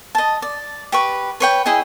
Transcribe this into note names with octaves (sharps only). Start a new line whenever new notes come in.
D#5 A5
D5
G4 B4 C#6
B4 C#5 G5
E4 G#4 D#5 G5